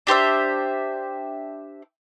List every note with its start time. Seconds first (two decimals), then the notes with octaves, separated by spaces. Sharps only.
0.07 D4 G4 C5 E5